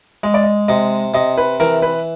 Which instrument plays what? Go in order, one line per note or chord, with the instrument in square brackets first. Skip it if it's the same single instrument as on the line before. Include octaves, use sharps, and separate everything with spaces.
[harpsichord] G#3 [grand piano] D#5
[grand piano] D5
D#5
[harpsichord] C3 [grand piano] D#5
[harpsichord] C3 [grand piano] D#5
[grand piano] B4
[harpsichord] E3 [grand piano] A#4
[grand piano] B4